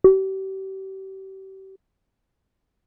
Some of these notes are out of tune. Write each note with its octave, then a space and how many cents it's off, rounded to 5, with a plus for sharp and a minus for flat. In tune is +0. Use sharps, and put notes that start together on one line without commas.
G4 -35